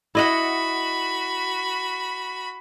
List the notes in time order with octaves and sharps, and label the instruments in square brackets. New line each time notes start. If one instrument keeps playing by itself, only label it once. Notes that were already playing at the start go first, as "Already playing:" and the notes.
[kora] E4 D#5 F#5 [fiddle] F#4 B5